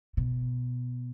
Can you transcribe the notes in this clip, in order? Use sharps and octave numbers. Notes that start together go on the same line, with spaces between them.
B2